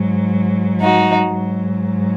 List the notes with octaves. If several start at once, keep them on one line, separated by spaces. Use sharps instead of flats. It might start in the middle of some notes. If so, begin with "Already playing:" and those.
Already playing: G#2 F#3
D#4 F#4
G#2 F#3